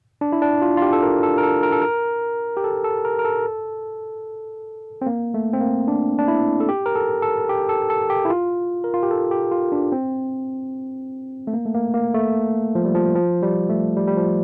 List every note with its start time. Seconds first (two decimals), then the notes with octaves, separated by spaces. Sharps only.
0.21 D4
0.32 E4
0.42 D4
0.62 F4
0.77 F4
0.82 G4
0.93 A4
1.02 A#4
1.23 A4
1.38 A#4
1.43 A4
1.63 A#4
1.72 A4
1.82 A#4
2.57 G4
2.64 A4
2.84 A4
3.05 A#4
3.19 A#4
3.25 A4
5.02 C4
5.06 A#3
5.34 A3
5.53 C4
5.61 A#3
5.88 D4
6.19 D4
6.28 E4
6.60 A4
6.69 G4
6.86 A#4
6.95 A4
7.22 A4
7.49 G4
7.69 A4
7.90 A4
8.10 G4
8.25 E4
8.30 F4
8.84 A#4
8.94 F4
9.03 G4
9.11 A4
9.31 G4
9.51 F4
9.72 D4
9.92 C4
11.47 A3
11.53 A#3
11.65 A3
11.74 A#3
11.94 A#3
12.14 A3
12.75 F3
12.85 G3
12.94 F3
13.15 F3
13.43 G3
13.69 A3
13.96 G3
14.07 G3
14.17 F3